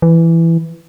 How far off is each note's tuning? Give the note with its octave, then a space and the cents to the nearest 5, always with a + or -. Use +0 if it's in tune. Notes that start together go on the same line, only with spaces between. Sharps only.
E3 +10